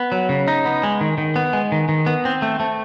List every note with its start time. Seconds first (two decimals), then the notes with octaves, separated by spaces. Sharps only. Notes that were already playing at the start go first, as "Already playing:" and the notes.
Already playing: B3
0.12 F#3
0.29 C#3
0.48 D#4
0.65 B3
0.83 G#3
1.01 D#3
1.18 D#3
1.36 B3
1.53 G#3
1.72 D#3
1.89 D#3
2.06 B3
2.25 C4
2.42 A3
2.60 A3